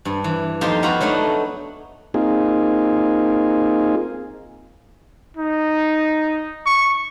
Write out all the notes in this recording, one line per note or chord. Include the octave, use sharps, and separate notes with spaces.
G2
E3
F2 A#3 D#4 G4 A5 C6
B3 F4 F#4 A#5 B5
F#3 A3 D4 D#4
A#3 C4 D#4 F4 G#4
D#4
C#6